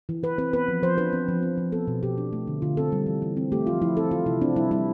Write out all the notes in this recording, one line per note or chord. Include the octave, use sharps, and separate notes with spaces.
E3
E3 B4
C4 B4
B3 B4
F3
F3 C5
D4 B4
C4
F3
C4
F3
B3 A4
B2
B2 G4
D4
A3
D3
D3 F4
C4 A4
G3
E3
E3
C4
A3 G4
F3 F4
F3 E4
C4 A4
E3 F4
C3 E4
C4 D4
G3 E4
G3 E4